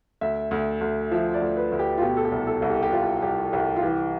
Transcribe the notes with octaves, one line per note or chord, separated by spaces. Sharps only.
D2 E5
D2
D2
F3 E5
D5
D2
B4
D2
G4
F4
B2 G4
A4
G4
C2
A4
C2
G4
G4
C2 F4
C2 G4
C2 G4
F4
E3 G4